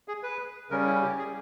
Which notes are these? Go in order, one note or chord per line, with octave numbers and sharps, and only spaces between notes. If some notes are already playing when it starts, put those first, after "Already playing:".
G#4
B4
C#3 G3 C#4 A#4
E4
G4
G#4